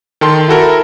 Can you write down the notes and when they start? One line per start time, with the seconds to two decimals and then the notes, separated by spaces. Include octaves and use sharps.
0.21 D#3 A4 G5 C6
0.48 E4 F#4 A4 A#4